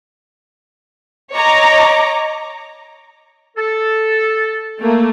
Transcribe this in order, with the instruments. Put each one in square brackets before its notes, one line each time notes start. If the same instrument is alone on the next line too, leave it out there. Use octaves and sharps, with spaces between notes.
[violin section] C#5 D#5 A#5 D6
[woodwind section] A4
[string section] A3 A#3